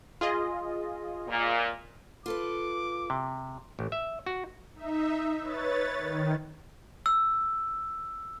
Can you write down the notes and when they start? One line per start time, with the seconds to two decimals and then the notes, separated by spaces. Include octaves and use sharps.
0.21 F4 G#4 D#5
1.28 A#2
2.26 F4 A4 B4 D6
3.10 C3
3.79 A1
3.92 E5
4.26 F#4
4.75 D#4 E5
5.41 B4 C#5 A6
5.97 D#3
7.06 E6